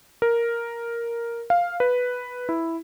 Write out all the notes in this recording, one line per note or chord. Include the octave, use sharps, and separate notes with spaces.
A#4
F5
B4
E4